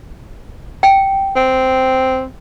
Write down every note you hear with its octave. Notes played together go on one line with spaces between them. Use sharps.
G5
C4